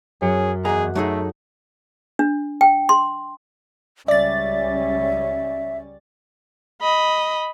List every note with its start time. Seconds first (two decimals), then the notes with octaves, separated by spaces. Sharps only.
0.22 F#2 C#4 G#4 C#7
0.65 E2 G#3 G#4 F#5 A#5
0.95 F#3 A3 D#4 G#4 A4
2.19 D4
2.61 G5
2.89 C6
4.08 C#2 G3 C#4 D5 E5 A6
6.81 D#5 B5